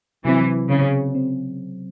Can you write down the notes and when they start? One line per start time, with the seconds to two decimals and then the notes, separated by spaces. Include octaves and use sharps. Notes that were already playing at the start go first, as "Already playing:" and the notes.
0.25 C3 E3 F#3 C4
0.69 C#3
1.15 C4